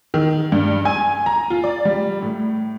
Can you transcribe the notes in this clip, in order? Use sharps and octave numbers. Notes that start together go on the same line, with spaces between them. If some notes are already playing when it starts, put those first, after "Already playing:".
D#3
G2
G#5
A#5
F4
D5
G3
A2